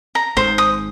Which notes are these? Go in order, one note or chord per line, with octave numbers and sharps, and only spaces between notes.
A#5
G#1 G#2 C5
D#6